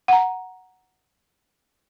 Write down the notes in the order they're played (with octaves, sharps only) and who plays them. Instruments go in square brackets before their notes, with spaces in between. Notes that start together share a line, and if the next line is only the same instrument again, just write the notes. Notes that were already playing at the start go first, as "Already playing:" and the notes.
[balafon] F#5 A#5